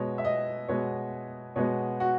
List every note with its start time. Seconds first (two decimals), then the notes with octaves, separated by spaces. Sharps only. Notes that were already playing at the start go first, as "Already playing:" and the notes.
Already playing: B2 G#3 B3 C#5
0.18 E5
0.25 D#5
0.68 B2 G#3 B3 C#5
1.56 B2 G#3 B3 C#5
2.00 F#4